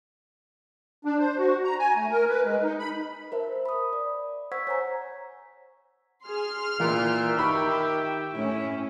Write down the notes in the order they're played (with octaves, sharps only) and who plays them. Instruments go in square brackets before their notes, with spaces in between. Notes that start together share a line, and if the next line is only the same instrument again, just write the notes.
[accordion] D4
C5
F#4
A#5
G#5
A3
A#4
B4
G#3
D#4
B5
[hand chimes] A#4 C5 E5 A5
B5 D#6
D5
C5 F#5 C#6 E6 G#6 B6
C#5 G#5 A#5
[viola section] G#4 [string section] C6 F6
[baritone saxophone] A#2 [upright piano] E3 [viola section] E5 G5
[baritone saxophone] D#3 [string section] G4 [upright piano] A#5 B5 C#6
[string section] A2 C#4 [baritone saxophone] E4